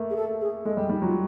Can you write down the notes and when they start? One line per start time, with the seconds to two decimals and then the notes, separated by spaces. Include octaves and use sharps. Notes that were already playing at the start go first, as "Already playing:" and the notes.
Already playing: A3 A#3
0.10 G#4
0.16 A4
0.41 G#4
0.65 G#3 A4
0.77 G3
0.89 G3 D#4
1.02 F#3 F4